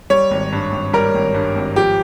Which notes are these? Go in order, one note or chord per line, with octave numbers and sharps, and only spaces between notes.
G3 C#5
G#1
G2
G#1
G3 A#4
G#1
G2
G#1
F3 G4